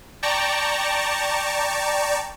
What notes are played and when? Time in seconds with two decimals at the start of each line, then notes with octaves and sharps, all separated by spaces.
0.23 D5 G5 A5 A#5 C#6